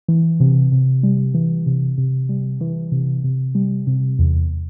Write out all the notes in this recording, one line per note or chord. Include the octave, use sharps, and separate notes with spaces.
E3
C3
C3
G3
E3
C3
C3
G3
E3
C3
C3
G3
C3
E2